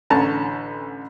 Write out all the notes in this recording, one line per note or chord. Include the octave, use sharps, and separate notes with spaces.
A1 D3 C#4 A5 A#5